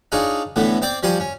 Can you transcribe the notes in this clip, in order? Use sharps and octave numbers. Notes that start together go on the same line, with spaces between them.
D4 D#4 F4 G#4 C#5
A2 D3 E3 A3 B3
C4 C5 D5 G5 D6
F3 G3 C5 G#5 C6 C#6
C#4